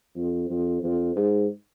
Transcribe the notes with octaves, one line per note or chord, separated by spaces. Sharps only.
F2
F2
F2
G#2